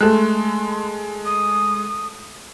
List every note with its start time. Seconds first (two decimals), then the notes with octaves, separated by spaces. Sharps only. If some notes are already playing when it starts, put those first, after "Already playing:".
0.01 G#3 A3 A4 C6 F#6
1.25 D#6